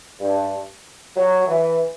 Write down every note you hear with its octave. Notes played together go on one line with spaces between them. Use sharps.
G2
F#3
E3